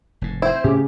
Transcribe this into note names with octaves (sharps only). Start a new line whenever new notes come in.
F1 G#2
C4 E4 C5
A2 C#3 C#4 G4